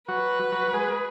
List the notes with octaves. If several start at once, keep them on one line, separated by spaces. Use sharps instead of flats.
F#3 F#4 B4
F#3 F#4
G#3 G#4